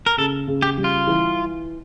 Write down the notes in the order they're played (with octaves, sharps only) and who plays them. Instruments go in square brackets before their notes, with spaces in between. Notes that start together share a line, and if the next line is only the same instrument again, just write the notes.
[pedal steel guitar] A#4
[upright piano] C#3 [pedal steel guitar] A4
[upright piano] C#3
[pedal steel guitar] G4
[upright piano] G3
[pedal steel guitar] F4
[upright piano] E3